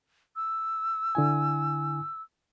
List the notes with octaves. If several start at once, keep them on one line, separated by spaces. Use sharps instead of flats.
E6
D3 E4 G#5